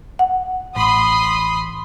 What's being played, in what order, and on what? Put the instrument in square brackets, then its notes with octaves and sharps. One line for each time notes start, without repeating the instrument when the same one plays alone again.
[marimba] F#5
[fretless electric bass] A1 [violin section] B5 C6 D#6